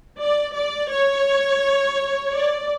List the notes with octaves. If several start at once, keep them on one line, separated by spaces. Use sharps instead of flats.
D5
D5
C#5
D5